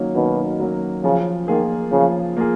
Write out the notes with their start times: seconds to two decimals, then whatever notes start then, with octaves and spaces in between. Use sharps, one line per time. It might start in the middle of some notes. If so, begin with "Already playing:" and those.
Already playing: D#3 F#3 A#3 C#4
0.14 B2 D#3
0.60 F#3 A#3 C#4
1.04 C#3 F3
1.48 D#3 A#3 F4 G#4
1.92 C#3 F3
2.37 A#3 F4 G#4